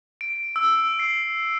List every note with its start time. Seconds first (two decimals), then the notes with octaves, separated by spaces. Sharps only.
0.21 D7
0.56 E6
0.99 C7